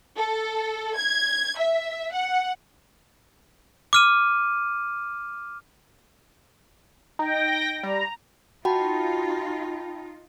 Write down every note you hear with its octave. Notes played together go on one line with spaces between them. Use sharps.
A4
G#6
E5
F#5
D6 F6 D#7
D#4 G5 A#6
G3 A#5
D#4 F4 F#4 G5 A5 B5